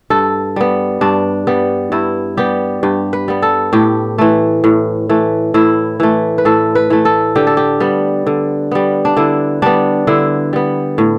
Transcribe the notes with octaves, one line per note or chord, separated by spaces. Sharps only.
G2 A4
G3 B3
G2 D4
G3 B3
G2 E4
G3 B3 G4
G2 G4
B4
G3 B3
A4
A2 G4
E3 A3
A2
E3 A3
A2 E4
E3 A3
B4
A2 A4
B4
E3 A3
A4
D3 G4
A4
G4
G3 B3
D3
G3 B3
D4
D3 E4
G3 B3 D4
D3 E4
G3 B3
A2